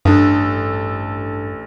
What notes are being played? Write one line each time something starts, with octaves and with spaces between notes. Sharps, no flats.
A1 G2 D4 A4 D#6